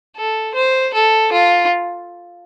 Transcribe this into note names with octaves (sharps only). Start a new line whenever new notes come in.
A4
C5
A4
F4